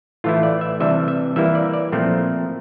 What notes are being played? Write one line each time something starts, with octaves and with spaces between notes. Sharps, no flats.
A2 E3 A3 E4 F4
D5
E5
C3 E3 G3 D4 E5
E5
E3 G3 A#3 E4 E5
D5
D5
A#2 F3 A3 C4